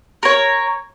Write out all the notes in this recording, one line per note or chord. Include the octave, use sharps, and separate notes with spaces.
A#4 C#5